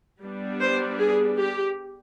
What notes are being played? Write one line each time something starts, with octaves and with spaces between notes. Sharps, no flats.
G3 B3 D4
C5
G#4
G4